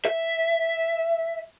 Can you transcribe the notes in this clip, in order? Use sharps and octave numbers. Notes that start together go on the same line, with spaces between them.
E5